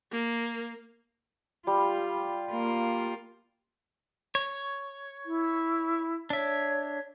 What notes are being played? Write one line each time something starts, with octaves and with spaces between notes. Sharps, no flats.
A#3
G3 F4
A#3 F4
C#5
E4
D4 C#5 E5